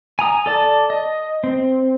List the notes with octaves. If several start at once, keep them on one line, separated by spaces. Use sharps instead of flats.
G#5 A#5 D#6
A4 D5 A5
D#5
C4